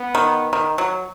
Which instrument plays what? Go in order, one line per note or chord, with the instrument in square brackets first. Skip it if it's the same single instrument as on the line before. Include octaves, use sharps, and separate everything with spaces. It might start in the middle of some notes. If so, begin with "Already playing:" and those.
Already playing: [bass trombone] B3
[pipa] D#3
D#3
F#3